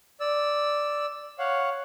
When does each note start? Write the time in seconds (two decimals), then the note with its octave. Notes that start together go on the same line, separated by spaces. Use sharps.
0.20 D5 E6
1.39 C#5 F5 F#5